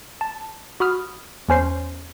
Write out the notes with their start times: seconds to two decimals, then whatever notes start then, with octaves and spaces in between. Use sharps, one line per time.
0.21 A5
0.80 F#4 B5 D#6 F6
1.49 E2 C#4 C5 C7